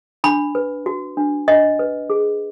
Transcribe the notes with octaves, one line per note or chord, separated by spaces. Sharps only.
D4 B5
B4
F#4
D4
D4 D#5
B4
G#4